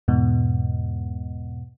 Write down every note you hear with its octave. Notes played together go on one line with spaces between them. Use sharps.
E2 G#2 B2